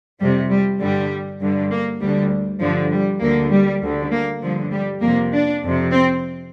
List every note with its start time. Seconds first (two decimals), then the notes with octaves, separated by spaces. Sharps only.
0.20 F2 C3 G3
0.50 G3
0.80 G2 D3 G3
1.40 G2 D3
1.71 A#3
2.01 D2 D3 G3
2.61 G2 D3 F3
2.91 G3
3.21 D2 D3 A#3
3.51 G3
3.82 D2 D3
4.11 A#3
4.42 G2 D3 F3
4.72 G3
5.02 F2 C3 A#3
5.32 D4
5.63 F2 C3
5.92 C4